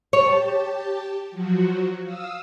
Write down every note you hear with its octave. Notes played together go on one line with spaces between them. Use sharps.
G4 C#5 A5
F3 F#3 F#4
F5 D#6 E6